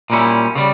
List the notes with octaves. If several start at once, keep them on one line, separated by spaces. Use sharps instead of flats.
A#2 G3 C#4 E4
C#3 G3